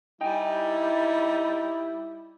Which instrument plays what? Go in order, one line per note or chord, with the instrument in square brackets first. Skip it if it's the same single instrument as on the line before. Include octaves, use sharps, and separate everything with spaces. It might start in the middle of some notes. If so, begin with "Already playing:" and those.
[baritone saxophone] G3 [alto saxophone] D#4 [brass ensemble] E4 [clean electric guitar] G5 G#5